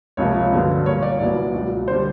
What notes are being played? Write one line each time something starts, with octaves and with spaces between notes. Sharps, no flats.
C#2 C3 F3 A#3 C#5
G2 D3 F#3 B3
A#2 G3 A#3 C#5
D5
C2 A#2 F#3 B3
C#2 B2 F#3
C5
D3 G3